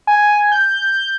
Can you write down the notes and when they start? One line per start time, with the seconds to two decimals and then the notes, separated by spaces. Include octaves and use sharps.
0.07 G#5
0.52 G6